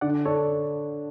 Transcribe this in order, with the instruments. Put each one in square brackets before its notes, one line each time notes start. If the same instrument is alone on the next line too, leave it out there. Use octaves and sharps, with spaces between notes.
[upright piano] D3 [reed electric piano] D5 F#5
[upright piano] D4 [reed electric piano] A4 C#5